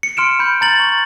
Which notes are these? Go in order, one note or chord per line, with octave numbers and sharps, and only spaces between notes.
C#7
C6 F6 D7 E7
B5 G6
A#5 A6 F#7
C#6